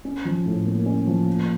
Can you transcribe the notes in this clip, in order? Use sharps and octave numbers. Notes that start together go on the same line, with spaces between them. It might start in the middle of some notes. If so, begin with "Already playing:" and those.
C#4
F3
A2
A#3
C#4
F3
A#3